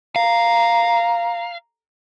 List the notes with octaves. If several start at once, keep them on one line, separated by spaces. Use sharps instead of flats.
F5 A#5